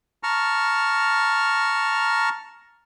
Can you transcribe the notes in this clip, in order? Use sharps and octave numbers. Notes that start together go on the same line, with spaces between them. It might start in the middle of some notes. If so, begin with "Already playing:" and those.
A5 A#5 C#6 F6